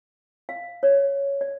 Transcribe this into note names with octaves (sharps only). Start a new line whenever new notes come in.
F5
C#5
D5
D5